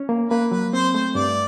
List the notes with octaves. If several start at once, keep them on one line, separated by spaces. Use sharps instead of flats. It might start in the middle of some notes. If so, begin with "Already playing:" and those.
Already playing: C#4
A#3
A#3 B4
F#3 B4
C4 C5
A3 C5
G2 D5